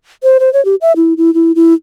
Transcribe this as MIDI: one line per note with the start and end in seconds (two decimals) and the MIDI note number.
0.23 0.38 72
0.40 0.52 72
0.53 0.63 73
0.65 0.75 67
0.81 0.92 76
0.96 1.14 64
1.17 1.34 64
1.34 1.52 64
1.56 1.74 64